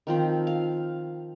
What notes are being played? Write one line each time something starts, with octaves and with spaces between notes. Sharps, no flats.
D#3 F3 C4
F5